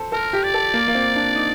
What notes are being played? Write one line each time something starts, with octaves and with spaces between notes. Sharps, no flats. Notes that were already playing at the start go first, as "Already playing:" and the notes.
Already playing: A4 C5
A4 A#4
G4
D5
A4
A#3
A#3
C4
D4
D#4